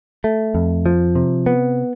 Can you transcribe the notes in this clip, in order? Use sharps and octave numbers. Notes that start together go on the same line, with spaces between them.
A3
F2
F3
C3
B3